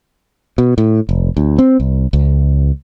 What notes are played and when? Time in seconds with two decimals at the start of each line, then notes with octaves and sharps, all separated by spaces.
0.58 B2
0.78 A2
1.09 F1
1.37 D2
1.59 C4
1.80 C2
2.13 C#2